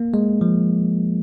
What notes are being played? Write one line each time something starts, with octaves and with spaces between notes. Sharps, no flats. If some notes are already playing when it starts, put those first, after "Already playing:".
Already playing: A#3
G#3
F3